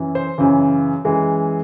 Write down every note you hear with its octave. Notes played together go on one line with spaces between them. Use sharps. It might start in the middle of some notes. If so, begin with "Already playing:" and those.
Already playing: F#2 E3
C5
F#2 C#3 E3
F#2 E3 G#3